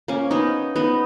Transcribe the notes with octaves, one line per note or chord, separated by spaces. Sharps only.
A#3 C#4
B3 D#4
B3 D#4